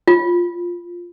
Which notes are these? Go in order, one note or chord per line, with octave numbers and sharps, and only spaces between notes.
F4